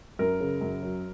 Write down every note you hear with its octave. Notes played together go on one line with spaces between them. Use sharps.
F#2 A#4
C#3
F#2
F#3